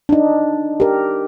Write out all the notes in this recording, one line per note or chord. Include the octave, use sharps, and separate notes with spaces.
D4 D#4
G4 A#4